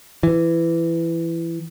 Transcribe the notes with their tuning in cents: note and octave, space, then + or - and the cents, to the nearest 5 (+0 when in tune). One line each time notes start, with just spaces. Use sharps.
E3 +15